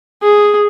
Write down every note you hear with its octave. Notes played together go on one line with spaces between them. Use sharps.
G#4